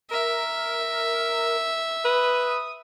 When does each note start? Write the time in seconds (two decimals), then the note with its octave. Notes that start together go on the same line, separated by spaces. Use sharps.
0.11 A#4 E5
2.05 B4 D#6